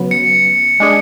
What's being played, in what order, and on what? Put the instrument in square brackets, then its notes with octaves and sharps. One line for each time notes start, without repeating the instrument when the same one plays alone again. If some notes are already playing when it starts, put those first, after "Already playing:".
Already playing: [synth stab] C#3 F#3 B3
[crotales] C#7
[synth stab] G#3 D4 G#4